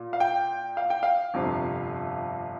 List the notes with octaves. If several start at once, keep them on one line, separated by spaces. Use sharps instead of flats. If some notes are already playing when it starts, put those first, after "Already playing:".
Already playing: A#2 F4
F5
G5
F5
G5
F5
G1 F2 C3